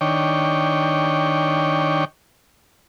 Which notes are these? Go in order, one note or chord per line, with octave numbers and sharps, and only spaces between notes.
D#3 D4 C#5 G5